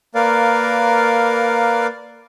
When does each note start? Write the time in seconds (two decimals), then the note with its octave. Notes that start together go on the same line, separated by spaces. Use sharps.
0.15 A#3 A#4 B4 D5 F5